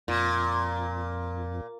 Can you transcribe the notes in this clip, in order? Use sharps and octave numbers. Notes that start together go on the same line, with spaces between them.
F2 A#2